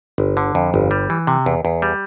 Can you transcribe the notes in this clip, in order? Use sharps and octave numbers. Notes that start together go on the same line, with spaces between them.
G1
D3
F2
G1
G3
E3
C3
E2
E2
G3